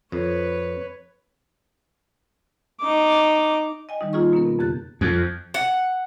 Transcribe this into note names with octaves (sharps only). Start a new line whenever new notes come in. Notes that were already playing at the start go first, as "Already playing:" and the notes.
F2 B4 C#5
D#4 D6
D#5 G5 G#5
D#3 G3 D#4
A#3 D#4 F4 G#4 D#5 C#6
B2 A#3 C#4 D#4 A#4
B3
F2 C#3 G4 F#6 A6
F2
F#5